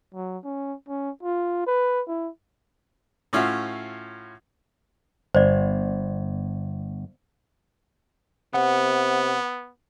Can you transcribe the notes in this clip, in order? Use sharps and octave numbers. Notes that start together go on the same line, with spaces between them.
F#3
C#4
C#4
F4
B4
E4
A2 C#4 F4 F#4 E5
G1 C5 D5
C3 B3 F#5